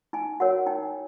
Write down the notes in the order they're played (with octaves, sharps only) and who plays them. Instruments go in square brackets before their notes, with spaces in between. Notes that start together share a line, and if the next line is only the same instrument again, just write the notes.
[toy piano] D#4 G#5
F#4 A#4 C#5 F#5
D#4 G5
G#5